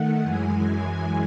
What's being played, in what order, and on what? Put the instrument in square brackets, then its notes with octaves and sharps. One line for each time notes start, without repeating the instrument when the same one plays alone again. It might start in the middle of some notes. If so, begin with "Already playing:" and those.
Already playing: [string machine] D#3 A3 F#5
F#2 E3 G#3 G#5